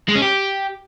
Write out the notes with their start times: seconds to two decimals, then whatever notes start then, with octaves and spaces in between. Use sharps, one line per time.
0.08 G#3
0.15 C#4
0.22 G4